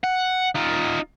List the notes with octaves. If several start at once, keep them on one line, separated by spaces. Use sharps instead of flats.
F#5
D#4 F4